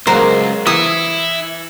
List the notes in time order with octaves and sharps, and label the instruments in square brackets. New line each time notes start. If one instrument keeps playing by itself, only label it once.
[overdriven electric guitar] C#2 [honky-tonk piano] F#3 G#3 A#3 [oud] A#4 [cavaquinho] C5
[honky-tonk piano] E3 [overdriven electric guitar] E4 [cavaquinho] D#6